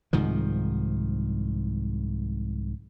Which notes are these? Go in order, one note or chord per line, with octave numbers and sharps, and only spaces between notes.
C2 G#2 D#3 F3